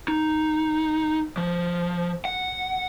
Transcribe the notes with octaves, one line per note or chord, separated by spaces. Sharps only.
D#4
F3
F#5